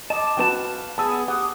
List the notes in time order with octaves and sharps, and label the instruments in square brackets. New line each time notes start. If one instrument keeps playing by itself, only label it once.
[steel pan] D#5 [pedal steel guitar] A5 D6
[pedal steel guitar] F#3 C4 A5 [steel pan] F#4 B4 G5
[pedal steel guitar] F5
[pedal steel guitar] B3 G#4 [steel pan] A5 E6
[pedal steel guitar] G4 D#6 [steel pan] F#5